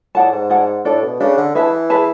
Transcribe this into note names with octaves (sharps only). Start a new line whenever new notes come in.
A2 G#4 D5 F#5 A5
G#2
G#4 D5 F#5 A5
A2 D4 A4 D5
B2
C#3 D4 A4 D5
D3
E3 G#4 B4 E5 A5
G#4 B4 E5 A5